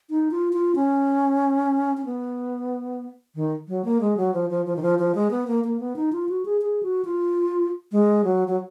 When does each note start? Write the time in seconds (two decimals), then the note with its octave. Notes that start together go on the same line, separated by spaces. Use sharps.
0.10 D#4
0.31 F4
0.53 F4
0.75 C#4
1.97 C#4
2.06 B3
3.35 D#3
3.68 F#3
3.85 A#3
4.01 G#3
4.17 F#3
4.34 F3
4.50 F3
4.66 F3
4.76 D#3
4.82 F3
4.99 F3
5.15 G#3
5.31 B3
5.47 A#3
5.64 A#3
5.80 B3
5.96 D#4
6.13 F4
6.29 F#4
6.45 G#4
6.61 G#4
6.83 F#4
7.05 F4
7.92 G#3
8.24 F#3
8.48 F#3